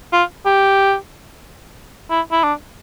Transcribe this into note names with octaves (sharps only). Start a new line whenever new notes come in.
F4
G4
E4
E4
D4